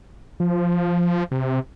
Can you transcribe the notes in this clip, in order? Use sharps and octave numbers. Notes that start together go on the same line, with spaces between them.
F3
C3